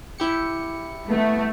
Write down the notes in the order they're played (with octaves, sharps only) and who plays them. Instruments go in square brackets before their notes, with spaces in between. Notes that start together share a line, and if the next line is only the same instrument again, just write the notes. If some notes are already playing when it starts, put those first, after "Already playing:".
[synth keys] E4 G4 C#7
[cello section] A3 [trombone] B3